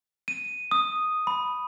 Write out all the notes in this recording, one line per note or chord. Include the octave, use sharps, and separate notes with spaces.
D#7
D#6
B5